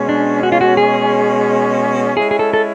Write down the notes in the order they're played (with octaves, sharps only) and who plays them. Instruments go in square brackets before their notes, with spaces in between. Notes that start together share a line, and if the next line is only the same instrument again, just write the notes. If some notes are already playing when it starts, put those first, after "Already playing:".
Already playing: [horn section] B2 G#3 C#4
[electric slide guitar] D4
F#4
F4
F#4
G#4
[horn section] G#3 C#4 E4 [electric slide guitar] G#4
[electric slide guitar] G#4
A4
A4